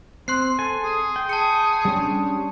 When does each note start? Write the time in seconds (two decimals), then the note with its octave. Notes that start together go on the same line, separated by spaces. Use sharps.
0.28 C4 C6 F#6 C7
0.59 A4 G#5
0.83 G#4
1.16 G5
1.29 G#4 A5 C#7
1.85 G3 C#4 D4